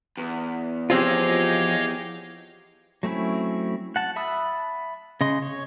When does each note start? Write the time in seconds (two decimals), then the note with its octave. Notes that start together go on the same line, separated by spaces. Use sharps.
0.17 E2
0.90 F3 C4 F4 G4 G#4 C#5 D#5 F5
3.03 F#3 A3 C4 C#4 E4
3.96 F#5 A5
4.16 E5 A5 B5 D#6 E6
5.21 C#3 D#5 C6
5.42 C#5